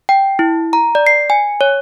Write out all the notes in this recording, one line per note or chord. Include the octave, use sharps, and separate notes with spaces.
G5
E4
A#5
D5
C7
G#5
C#5